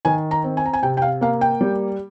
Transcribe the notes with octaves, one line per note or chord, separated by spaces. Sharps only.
D#3 G#5
A#5
C4
G#5
A#5
G#5
C3 G5
G5
F5
A#3 F5
G5
G3